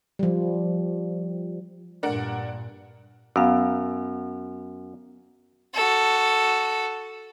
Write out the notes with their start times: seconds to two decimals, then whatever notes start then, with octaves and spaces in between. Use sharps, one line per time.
0.19 F3 G3
2.03 G2 A#2 D4 A#4 F#5
3.36 F#2 B3 F5
5.74 F#4 A4